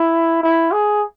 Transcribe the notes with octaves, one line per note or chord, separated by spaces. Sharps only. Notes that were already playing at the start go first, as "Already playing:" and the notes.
Already playing: E4
E4
G#4